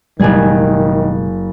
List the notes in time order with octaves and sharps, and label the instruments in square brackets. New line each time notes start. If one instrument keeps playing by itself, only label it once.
[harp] F#1 G#4 G#6 [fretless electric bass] B2 G3 G#3 [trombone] D#3